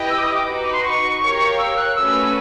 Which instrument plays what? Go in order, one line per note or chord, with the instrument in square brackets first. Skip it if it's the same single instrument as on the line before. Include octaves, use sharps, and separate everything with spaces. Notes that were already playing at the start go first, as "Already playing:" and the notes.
Already playing: [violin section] E4 G4 B4 D#5 G5
[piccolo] E6
D6
D#6
D6
[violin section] D#4 F#4 B4
[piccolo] C6
C#6
[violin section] G4 A#4 C#5 F5
[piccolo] E6
F#6
[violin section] A3 C#4 F#4 B4 [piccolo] E6